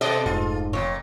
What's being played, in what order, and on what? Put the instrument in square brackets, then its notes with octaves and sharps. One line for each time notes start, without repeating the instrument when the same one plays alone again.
[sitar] B2 D5 D#5 [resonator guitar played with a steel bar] A4
[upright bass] F1 [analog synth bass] G#2 [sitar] F4
[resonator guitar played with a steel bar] F2 C#5 [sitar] A#2